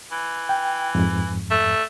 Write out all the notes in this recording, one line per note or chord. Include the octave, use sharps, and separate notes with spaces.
E3
G5
F2 G#2
A3